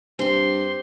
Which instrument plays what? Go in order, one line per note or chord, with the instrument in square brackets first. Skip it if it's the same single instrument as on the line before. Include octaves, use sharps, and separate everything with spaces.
[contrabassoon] G2 [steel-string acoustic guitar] C4 G4 [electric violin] C6